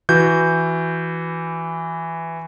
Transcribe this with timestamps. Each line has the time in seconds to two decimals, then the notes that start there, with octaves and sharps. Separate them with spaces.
0.09 E3 F#4 G6